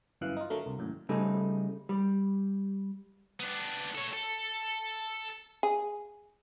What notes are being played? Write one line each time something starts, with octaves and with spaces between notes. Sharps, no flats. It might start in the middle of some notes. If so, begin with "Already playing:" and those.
G1 F#2 E3 F5 F#6
D#4 F4
D3 F#3 A3 A#4
C2
G#1 F#2 A2
C#3 G3 A3 D#4
G3
B3 D4
A4 C#5
A4
G#4